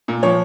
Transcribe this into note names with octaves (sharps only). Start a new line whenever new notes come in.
A#2
F3 C#5